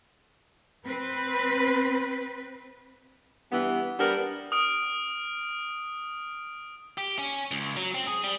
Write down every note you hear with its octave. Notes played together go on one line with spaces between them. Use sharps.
C4 B4
G2 E3 B3
G3 B3 D4 A#4
D#6 F6 D7
G4
C#4
C#2
F#3
C4
G#4
G3